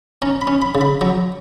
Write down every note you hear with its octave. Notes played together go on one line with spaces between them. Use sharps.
C#4 A#5
B5
C#4
B5
C#3
B5
F#3 A#5